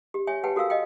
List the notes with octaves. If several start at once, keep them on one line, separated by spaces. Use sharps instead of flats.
G4
C#5 E5 G#5
G4 B4 F#5 G5 A5
F#4 A4 A#4 F5 E6
D#5 F5 G5